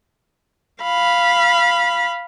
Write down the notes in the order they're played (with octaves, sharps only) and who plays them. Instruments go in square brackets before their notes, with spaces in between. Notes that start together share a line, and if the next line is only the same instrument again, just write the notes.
[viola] F5 B5